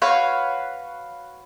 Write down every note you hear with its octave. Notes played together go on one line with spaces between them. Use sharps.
F#4 B4 C#5 F5